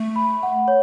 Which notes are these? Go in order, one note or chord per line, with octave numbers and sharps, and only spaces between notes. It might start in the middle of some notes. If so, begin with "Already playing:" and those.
Already playing: A3
B5
F#5
C#5